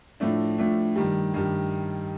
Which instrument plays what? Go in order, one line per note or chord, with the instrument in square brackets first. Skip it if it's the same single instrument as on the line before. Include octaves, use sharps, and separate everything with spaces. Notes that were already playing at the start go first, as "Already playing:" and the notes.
[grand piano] A2 F3 A3 D4
A2 F3 A3 D4
G2 D#3 G3
G2 D#3 G3